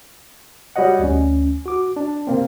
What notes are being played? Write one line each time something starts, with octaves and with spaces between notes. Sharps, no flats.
G3 F#4 C#5 D#5 F#5
D2 C#4
F#4 D6
D4
C3 A#3 C4